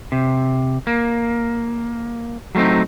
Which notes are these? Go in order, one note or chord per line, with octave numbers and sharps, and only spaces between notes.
C3
A#3
F#3 G3 A3 C4 D#4